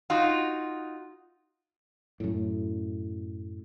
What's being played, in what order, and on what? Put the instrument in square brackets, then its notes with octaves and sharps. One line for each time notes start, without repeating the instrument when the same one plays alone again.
[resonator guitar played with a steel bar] D#4 F4 F#4
[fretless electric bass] F#2 A2